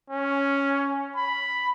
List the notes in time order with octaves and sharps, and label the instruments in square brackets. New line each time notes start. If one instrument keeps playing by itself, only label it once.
[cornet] C#4
B5